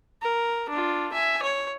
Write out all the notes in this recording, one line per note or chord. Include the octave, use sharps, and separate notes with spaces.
A#4
D4 F4
E5 G#5
C#5